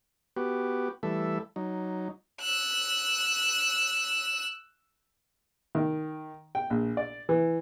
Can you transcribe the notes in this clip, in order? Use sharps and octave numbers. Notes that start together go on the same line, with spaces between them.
B3 F#4 G4
E3 G3 A3 A4 E5
F#3 D#4
E6 F#6
D#3
G5
A#1
D5
E3